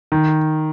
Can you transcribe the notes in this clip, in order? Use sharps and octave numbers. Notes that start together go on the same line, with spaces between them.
D#3